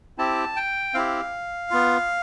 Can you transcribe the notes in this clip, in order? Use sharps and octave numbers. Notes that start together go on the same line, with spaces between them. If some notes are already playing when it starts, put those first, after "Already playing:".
C4 E4 G4 A5
G5
C4 E4 G4 F5
B3 F4